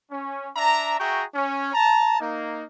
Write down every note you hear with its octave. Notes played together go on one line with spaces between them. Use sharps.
C#4
D4 D5 E5 A#5
F#4 G#4 E5 G5 A#5 C#6
C#4
A5 A#5
A#3 D#4